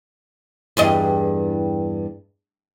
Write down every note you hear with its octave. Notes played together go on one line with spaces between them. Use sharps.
E2 G2 D#5